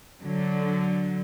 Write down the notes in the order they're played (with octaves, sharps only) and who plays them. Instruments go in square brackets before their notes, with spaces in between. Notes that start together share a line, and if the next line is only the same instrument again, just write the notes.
[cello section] D3 F#3